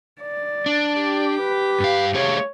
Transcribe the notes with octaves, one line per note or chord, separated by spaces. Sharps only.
D5
D4
G4
B4
G2 F5
A3 G#4 C#5 F5